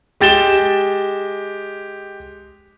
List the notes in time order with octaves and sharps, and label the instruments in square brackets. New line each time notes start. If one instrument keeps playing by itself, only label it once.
[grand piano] G#3 G4 A6 E7 G7